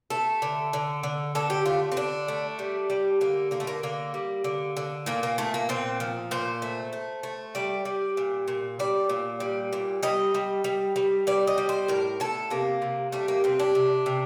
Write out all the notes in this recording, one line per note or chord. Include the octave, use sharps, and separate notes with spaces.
A3 A4
D3
D3
D3
D3 A4
G4
A3 F4
C4
D3 D4
A3
G3
G3
D3 A#3
D3 A#3
A3
A#3
D3 A#3
G3
D3
D3
A#2 A#3
A#3
A#2 A3
A#3
A#2 C4
F3
A#2 C5
A3
A3
A3
G3 D5
G3
A#2
A#2
G3 D5
A#2
G3
A#2
G3 D#5
G3
G3
G3
G3 D5
D#5
G3
C5
A2 A#4
A2 A4
C3 A#3
C3
G3 A3
A#3
C3 C4
D4
C3
C3